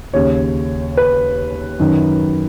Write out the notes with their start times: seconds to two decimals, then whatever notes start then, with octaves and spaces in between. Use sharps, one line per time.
0.14 D#2 C#3 C#5
0.97 B4
1.80 F#2 D#3